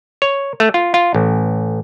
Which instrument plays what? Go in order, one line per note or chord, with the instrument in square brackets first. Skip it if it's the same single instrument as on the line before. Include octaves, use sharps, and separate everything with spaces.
[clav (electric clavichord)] C#5
A3
F4
F4
A1